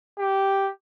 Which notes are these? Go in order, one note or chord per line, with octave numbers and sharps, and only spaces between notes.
G4